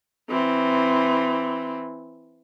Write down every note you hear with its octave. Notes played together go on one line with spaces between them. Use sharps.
E3 C4